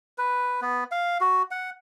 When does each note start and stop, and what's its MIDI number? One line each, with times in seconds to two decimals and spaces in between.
0.18 0.60 71
0.62 0.84 59
0.91 1.18 77
1.21 1.42 66
1.51 1.70 78